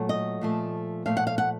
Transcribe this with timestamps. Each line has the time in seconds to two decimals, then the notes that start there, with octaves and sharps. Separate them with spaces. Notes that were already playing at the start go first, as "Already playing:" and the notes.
Already playing: A#2 F#3 A3
0.09 D#5
0.41 A#2 F3 A3
1.06 A#2 F3 A3 F5
1.17 F#5
1.27 F5
1.38 F#5